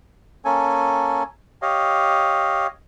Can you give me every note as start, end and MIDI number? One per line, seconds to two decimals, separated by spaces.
0.45 1.23 58
0.45 1.23 61
0.45 1.23 69
0.45 1.23 80
1.62 2.67 67
1.62 2.67 73
1.62 2.67 75
1.62 2.67 77